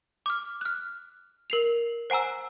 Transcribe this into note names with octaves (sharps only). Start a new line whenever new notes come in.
D6 F6
F6 F#6
A#4 C7 F7
C5 F#5 G#5 A#5 E6